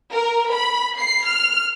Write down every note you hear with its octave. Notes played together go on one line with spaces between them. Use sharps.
A#4
B5
C7
F6